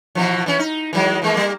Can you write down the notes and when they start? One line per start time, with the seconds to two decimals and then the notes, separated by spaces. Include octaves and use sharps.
0.15 B2 E3 F3
0.46 E3 C#4
0.59 D#4
0.93 E3 F#3 G#3
1.22 E3 G#3 A#3
1.34 G3 A#3